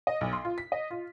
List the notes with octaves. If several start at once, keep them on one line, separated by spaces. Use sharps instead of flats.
D#5
B1
C6
F4
B6
D#5
F4